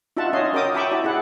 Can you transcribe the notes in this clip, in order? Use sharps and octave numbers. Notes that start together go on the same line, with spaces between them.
D#4 F4 F#4 E5 F#5 A5
C#4 C#5 D#5 C6
F#4 A#4 D#5 G5 D6 D#6
E5 G5 A5 B5 C#6 D6
E4 F#4 D5
E4 G#4 F#5